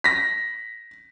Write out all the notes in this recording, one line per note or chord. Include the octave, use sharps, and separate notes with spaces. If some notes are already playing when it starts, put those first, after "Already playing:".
A#6 B6